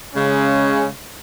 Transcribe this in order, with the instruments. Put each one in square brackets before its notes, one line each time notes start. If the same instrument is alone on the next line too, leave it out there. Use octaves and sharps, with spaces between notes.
[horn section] C#3 G#3 C#4